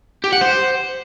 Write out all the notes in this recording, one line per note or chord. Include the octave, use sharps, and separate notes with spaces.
G4
F#5
C5